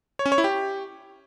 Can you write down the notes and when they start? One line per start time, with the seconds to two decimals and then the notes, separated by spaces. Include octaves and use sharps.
0.19 C#5
0.26 C#4
0.32 C#5
0.38 E4
0.44 G4